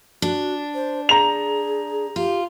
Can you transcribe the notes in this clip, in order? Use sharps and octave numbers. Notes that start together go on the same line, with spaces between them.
D4 F#4
C5
G#4 A#5 F7
F4 G4